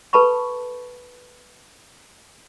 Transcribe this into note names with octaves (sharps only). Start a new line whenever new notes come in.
A4 B4 A5 B5 C#6